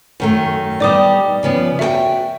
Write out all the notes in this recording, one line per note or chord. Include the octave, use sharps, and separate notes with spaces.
F#2 D#3 A3
G3 B3 D#4 D5 D6 D#6
C#3 F3 B3
F#4 A4 E5 G5